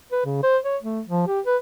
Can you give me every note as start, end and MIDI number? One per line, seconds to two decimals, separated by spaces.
0.12 0.23 71
0.25 0.42 49
0.43 0.58 72
0.64 0.77 73
0.82 1.01 57
1.08 1.26 53
1.27 1.40 67
1.46 1.57 71